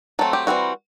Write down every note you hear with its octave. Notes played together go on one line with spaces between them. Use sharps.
F#3 A3 C4 A4
G4
E3 G3 C4 F#4